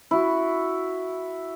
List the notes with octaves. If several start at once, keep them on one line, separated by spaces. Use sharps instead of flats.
E4 F#4